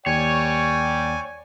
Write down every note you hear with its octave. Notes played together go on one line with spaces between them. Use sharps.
D#2 C#5 D5 G5 G#5